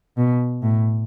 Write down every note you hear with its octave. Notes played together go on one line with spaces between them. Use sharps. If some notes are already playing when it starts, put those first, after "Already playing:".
B2
A2